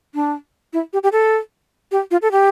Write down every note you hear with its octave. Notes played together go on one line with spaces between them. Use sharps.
D4
E4
G4
G4
A4
G4
F4
A4
G4